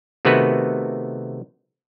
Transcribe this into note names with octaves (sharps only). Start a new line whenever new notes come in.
C3 D#3 A3 B3 F#4 B4